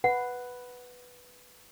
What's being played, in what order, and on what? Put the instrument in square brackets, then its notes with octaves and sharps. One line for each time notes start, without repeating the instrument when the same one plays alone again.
[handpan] B4 [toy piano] F#5